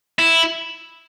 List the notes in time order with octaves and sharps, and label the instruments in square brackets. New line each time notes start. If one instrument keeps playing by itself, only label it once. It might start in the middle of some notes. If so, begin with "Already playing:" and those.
[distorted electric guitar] E4